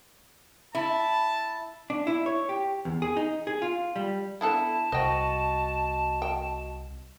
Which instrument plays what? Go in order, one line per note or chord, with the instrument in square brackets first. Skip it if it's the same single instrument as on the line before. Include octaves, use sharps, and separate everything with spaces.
[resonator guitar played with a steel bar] E4 [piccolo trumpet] A5
[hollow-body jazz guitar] D4
E4
C#5
G4
E2
G#4
D#4
G#4
F4
G3
[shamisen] B3 D4 A4 [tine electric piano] E4 [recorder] A5
[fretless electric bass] C2 [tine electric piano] F#4 D#5 [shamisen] C5 G5
[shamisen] G5